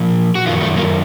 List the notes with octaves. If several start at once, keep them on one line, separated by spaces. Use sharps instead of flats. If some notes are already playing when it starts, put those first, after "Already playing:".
Already playing: A#2 F3
F#4
F#2 D#3 F4
A3
A#3